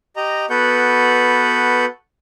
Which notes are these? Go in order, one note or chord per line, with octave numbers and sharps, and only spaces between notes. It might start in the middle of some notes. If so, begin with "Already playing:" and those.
G4 D#5 A#5
B3 F#4 A4 B4 F#5 G6